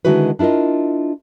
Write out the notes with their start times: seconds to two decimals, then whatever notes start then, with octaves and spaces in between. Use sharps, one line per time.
0.05 D3 D#3 G#3 E4 F#4 B4
0.39 D4 E4 F4 A#4 D#5